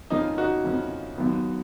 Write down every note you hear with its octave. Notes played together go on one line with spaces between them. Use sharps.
F2 C#3 F3 A#3 D#4
D#4 F#4
F2 C#3 F3 A#3
D#2 D#3 F#3 B3